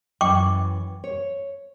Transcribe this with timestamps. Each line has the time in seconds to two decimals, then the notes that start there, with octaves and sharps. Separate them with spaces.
0.21 F#2 E3 G5 C#6 D6
1.04 C#5